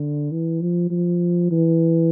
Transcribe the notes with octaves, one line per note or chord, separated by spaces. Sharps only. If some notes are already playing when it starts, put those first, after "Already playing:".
Already playing: D3
E3
F3
F3
E3